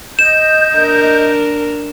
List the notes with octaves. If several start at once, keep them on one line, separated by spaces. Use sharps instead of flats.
D#5 G6 E7
D4 A#4